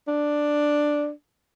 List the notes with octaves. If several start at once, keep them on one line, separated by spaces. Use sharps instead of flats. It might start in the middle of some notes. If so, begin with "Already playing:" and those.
D4